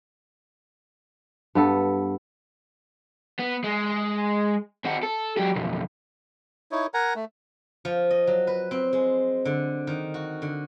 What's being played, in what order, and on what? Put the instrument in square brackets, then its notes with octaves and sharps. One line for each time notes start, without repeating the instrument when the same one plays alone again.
[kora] G2 B3 A4
[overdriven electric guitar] B3
G#3
C4 F#4
A4
F#3 G4
B1 F2
[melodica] D#4 E4 C#5
A#4 F#5 G#5 A#5
A3
[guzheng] F3
D#5
F#3
B4
C4
G#3
D3
D#3
F#4
D3